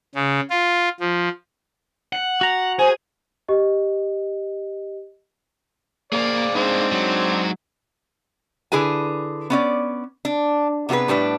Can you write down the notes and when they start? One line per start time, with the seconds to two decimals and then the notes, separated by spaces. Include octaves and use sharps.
0.15 C#3
0.50 F4
1.00 F3
2.13 F#5
2.41 F#4 A#5
2.79 G#4 C5 G#5
3.48 G4 D#5
6.13 A#3 G#4 C5 D5 F5
6.56 G#3 C4 D4 D#4
6.92 F#3
8.72 D3 E4 G#4 B4 G#5
9.50 B3 C#4 D5
10.25 D4
10.89 C3 B3 F#4 G#4 B4
11.08 A2 G3 D4 B4